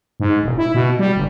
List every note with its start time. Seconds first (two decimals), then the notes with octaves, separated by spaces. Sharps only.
0.20 G#2
0.43 E1
0.58 E4
0.74 B2
0.99 G3
1.16 G1